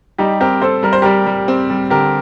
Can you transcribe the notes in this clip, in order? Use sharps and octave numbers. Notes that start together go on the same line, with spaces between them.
G3 D#4 G4
C4 G4 A#4
C4 A4 C5
G3 A#4
C5
G3 G4 A#4
G3
C4
G3
D3 G4 A#4